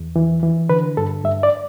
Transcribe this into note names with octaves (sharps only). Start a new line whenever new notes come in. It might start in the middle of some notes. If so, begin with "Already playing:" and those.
Already playing: E2
E3
E3
D3 B4
G2 A4
G2 E5
D5